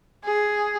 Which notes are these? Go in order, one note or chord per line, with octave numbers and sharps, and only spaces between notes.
G#4